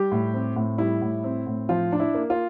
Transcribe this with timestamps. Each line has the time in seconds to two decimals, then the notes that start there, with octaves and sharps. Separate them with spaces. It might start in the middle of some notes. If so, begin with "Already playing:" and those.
Already playing: G3 G4
0.12 A2
0.34 C4
0.56 A2
0.78 G3 E4
1.01 A2
1.24 C4
1.47 A2
1.69 F3 F4
1.92 D4
2.00 E4
2.14 A#3
2.30 F4